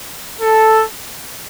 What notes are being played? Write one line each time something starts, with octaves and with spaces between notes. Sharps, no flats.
A4